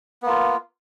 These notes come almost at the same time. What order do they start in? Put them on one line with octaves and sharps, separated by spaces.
B3 A#3 F4